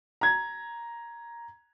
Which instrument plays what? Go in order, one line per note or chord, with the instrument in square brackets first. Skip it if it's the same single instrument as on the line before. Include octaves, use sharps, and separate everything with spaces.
[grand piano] A#5 G#6